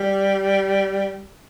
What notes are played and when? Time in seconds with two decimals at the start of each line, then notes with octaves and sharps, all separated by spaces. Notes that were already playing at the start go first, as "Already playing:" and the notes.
Already playing: G3